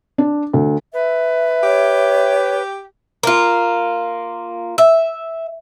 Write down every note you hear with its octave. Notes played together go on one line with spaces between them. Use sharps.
D4
D2
B4 E5
G4 C#5
A#3 F4
E5